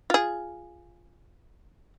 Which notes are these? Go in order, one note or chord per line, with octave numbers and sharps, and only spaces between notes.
F4 G#4